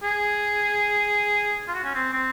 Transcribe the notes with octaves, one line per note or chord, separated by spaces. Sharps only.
G#4
F4
F#4
C#4
C4
C4